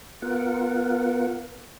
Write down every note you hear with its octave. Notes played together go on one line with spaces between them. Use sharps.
B3 F4 A#4 F#5